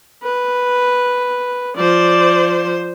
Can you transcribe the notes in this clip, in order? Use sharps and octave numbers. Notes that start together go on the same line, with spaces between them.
B4
F3 C5 D5